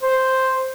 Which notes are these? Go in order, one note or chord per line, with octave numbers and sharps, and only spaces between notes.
C5